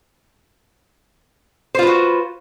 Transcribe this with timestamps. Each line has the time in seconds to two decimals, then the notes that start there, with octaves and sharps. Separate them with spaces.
1.75 C5
1.79 F4
1.83 B4
1.87 F#4